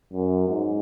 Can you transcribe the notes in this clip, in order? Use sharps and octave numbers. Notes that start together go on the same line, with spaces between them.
F#2
G#2